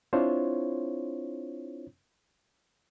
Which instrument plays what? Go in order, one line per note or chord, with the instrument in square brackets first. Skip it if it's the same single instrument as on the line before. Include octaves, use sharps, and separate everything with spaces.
[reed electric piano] C4 D4 E4 F4 C5 C#5